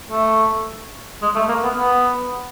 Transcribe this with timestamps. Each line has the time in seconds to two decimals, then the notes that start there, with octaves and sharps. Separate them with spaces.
0.10 A3
1.22 G#3
1.35 A3
1.48 A#3
1.63 B3
1.77 B3